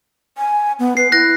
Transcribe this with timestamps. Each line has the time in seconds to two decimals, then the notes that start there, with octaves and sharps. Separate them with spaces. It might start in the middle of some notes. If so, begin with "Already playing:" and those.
0.38 G#5
0.79 B3
0.97 B4 C7
1.12 E4 F#6 A#6